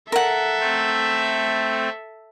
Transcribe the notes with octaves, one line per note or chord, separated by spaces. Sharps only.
A4 A#4 E5 F#5
A3 C4